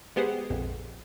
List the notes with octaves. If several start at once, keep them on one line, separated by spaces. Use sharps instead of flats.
G#3 B3 G4 G#4 C5 F#5
A#1 F2